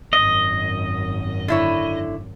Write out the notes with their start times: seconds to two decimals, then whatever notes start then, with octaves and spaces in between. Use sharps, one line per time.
0.13 G#1 F#2 D#5
1.48 D3 E4 C#5